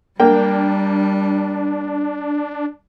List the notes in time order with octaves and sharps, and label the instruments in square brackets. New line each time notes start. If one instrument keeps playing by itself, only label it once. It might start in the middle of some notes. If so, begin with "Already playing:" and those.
[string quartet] G3 [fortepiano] A#3 G5 [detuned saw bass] D4